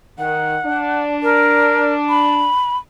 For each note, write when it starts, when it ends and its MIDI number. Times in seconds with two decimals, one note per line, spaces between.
0.18 0.56 51
0.18 1.02 78
0.65 2.49 62
1.23 1.93 70
2.09 2.77 83